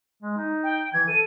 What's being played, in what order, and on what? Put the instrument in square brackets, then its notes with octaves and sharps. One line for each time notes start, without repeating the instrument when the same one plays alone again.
[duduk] G#3
D#4
[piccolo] G5
[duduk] E3 [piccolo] G#6
[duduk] A4 [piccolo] D#7